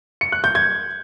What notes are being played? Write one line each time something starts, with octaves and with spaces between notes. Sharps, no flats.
C#7
F#6
G6
G#6